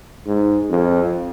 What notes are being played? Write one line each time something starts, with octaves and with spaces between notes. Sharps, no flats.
G#2
F2